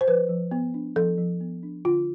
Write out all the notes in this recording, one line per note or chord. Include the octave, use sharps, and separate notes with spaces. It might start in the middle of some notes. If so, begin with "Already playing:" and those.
C5
F3 B4
F3
B3
D4
F3 A4
F3
B3
D4
D3 F4